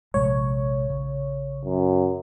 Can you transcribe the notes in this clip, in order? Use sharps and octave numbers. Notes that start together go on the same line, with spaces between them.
A#1 C3 G#3 C#5
C#3
F#2